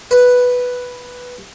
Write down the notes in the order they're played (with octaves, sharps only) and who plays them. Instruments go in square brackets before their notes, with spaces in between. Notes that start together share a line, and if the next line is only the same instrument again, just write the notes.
[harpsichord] B4